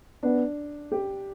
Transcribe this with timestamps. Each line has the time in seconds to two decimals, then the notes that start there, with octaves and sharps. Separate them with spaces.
0.23 B3 D4
0.92 G4